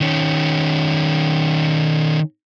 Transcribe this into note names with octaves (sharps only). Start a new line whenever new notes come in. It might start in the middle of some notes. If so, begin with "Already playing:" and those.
D#3 C#4